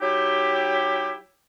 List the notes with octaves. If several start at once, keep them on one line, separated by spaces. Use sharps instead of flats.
F#3 D#4 E4 G4